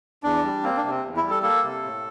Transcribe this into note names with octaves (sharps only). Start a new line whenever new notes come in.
E2 D4
G3
A#3 C4
D4
C3
C4
E2
E4
G3
A4
A#3 A4
C3
A2